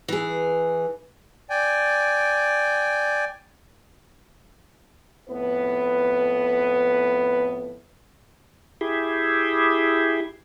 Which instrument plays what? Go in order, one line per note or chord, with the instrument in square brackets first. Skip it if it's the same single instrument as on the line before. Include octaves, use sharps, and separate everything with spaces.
[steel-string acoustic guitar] E3 G#4
[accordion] D5 G5 G#5
[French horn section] F2 A2 B3 B4
[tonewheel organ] E4 G4 G#4